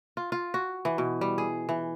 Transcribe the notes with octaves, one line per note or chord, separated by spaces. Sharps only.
F4
F4
F#4
E3
B2
G3
G#4
E3